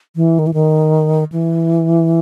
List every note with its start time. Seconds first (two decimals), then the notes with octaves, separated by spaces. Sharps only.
0.16 E3
0.39 D#3
0.47 E3
0.54 D#3
1.32 E3